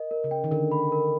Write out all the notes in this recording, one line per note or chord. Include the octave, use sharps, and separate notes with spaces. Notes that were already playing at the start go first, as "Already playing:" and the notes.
Already playing: A#4 D#5
A#4
C#3
G5
D#3
D3 A#4
B5
A#4